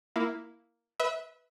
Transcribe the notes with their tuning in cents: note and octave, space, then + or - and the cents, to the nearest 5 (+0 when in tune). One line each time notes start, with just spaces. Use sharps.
A#3 +0 E4 +0 F5 +5
B4 +0 E5 -30